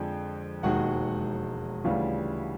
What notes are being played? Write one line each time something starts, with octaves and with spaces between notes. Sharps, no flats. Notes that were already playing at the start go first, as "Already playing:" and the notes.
Already playing: F2 D3 F3 G#3
E1 D#2 D#3 G#3 F#4 F#5
D2 C#3 E3 G3 F4 F5